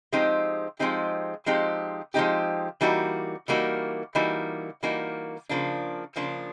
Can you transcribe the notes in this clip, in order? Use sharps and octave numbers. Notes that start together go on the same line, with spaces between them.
F3 G#3 C4 D#4 G4
F3 G#3 C4 D#4 G4
F3 G#3 C4 D#4 G4
F3 G#3 C4 D#4 G4
E3 G3 A#3 D#4 F#4
E3 G3 A#3 D#4 F#4
E3 G3 A#3 D#4 F#4
E3 G3 A#3 D#4 F#4
C#3 F3 A#3 D4
C#3 F3 A#3 D4